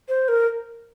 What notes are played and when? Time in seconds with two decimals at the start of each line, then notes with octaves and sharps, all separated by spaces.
0.09 C5
0.28 A#4